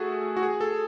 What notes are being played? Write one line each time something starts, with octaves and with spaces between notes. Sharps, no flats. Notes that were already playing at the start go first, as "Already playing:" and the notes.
Already playing: A3 F#4 G#4 A4
F#4
G#4
A4